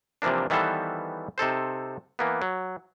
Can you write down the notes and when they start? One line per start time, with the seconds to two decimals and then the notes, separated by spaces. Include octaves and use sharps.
0.22 C3 E3 F3 A#3 D4
0.50 D#3 E3 G3 B3 A4 C5
1.38 C3 D#4 A4 C5
2.19 E3 A#3 B3
2.42 F#3